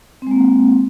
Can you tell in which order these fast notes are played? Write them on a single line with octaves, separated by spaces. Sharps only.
C4 G#3 A#3